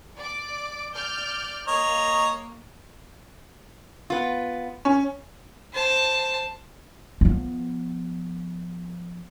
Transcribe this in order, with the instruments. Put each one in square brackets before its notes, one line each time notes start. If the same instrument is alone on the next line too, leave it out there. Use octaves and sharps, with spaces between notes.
[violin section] D5 D6
D5 F6 G6
[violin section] A#3 [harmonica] C#5 D#5 A#5
[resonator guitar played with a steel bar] B3 F4
[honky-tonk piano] C#4
[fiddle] C5 A5
[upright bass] F3 B3